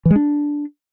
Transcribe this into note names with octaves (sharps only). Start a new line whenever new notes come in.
E3
G#3
D4